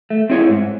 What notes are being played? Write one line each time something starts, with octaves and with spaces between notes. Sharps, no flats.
A3
C4 E4 G#4 C#5
G#2